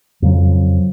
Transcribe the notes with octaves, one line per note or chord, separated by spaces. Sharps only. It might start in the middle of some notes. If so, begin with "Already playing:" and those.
F2 C#3 F#3